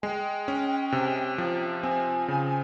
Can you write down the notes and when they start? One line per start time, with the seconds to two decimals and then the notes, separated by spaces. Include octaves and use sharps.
0.02 G#3 G5 G#5
0.48 C#4
0.92 C3
1.38 F3
1.83 C4 G#5
2.28 C#3